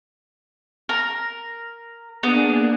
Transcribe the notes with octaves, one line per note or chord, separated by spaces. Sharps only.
A#4
A#3 B3 D4 G#4